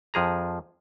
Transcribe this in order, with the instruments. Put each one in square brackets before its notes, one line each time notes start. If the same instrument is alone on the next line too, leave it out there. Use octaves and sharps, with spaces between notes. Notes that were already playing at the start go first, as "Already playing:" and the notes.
[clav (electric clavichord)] F2 F3 G#4 A#5